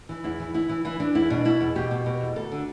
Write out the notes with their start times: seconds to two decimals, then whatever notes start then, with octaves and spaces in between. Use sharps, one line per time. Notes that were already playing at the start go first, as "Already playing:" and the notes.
0.09 E3
0.24 E2 E4
0.40 E3
0.54 E3 E4
0.69 E3
0.85 E3 E4
1.00 E3 D4
1.15 E2 E4
1.30 B2 D4
1.45 B2 E4
1.61 E2
1.75 B2 G4
1.91 B2
2.06 B2
2.21 E2
2.36 D2 A4
2.52 D3